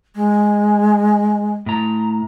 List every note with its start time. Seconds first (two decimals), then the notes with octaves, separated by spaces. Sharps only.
0.15 G#3
1.66 A2 A#5